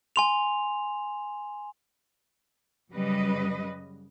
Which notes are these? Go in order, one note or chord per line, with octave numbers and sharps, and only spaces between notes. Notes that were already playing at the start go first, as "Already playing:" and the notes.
G#5 C6 F7
F#2 C#3 G3 B4 D#5